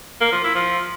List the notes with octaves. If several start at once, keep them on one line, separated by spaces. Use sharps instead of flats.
A#3
F3
E4
F3